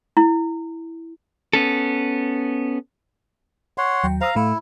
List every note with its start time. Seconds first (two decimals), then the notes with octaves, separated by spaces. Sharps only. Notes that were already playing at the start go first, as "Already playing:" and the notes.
0.17 E4
1.53 B3 C#4 A4
3.78 C#5 F#5 C6
4.04 D#2 F#3 G5
4.21 C5 F5 A#5 D#6 E6
4.36 A2 A3 E4 F5